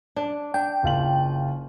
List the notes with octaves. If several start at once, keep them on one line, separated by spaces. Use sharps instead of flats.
D4
D4 G5
F#1 F4 F#7